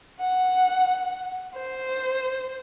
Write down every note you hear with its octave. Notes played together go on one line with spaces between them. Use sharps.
F#5
C5